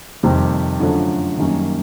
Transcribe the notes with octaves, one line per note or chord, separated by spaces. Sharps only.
F2 C3 D#3 G3
F#2 D3 F3 A3 D4
F#2 D#3 G3 A#3 C#4